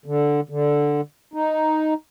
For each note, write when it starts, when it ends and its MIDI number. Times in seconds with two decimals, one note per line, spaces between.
0.06 0.41 50
0.49 1.01 50
1.34 1.94 63